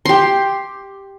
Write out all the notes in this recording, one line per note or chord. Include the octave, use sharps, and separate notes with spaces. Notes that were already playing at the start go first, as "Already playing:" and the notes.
G4 C6